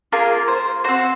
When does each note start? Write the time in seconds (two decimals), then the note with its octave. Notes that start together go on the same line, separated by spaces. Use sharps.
0.12 A#3 F4 G#4 A#4
0.48 C5
0.84 C4 F#4 C5